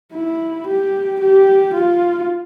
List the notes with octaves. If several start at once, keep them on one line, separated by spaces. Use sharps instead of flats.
E4
G4
G4
F4